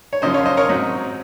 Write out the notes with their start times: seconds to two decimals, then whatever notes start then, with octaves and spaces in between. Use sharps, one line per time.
0.13 C#5
0.22 F#2 C#3 F3 C5 D#5
0.34 C#5 F5
0.45 C5 D#5
0.57 A#4 C#5
0.69 G#2 F#3 C4 D#4